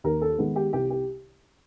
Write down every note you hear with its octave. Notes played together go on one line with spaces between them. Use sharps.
D#2 A#4
A4
D#3 G#3 B3
G4
C2 G4
G4